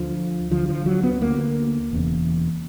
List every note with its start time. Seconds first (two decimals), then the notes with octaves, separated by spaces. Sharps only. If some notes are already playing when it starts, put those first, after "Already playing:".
Already playing: D2 D3 F3
0.50 D2 D3 F3
0.69 F3
0.86 F#3
1.03 B3
1.21 D2 D3 A#3
1.91 E1 E2 C#3